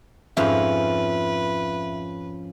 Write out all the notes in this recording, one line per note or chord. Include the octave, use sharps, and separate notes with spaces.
F2 G#2 F3 C#4 F4 B4 E5